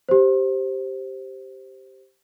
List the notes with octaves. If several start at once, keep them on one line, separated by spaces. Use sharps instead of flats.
G4 C5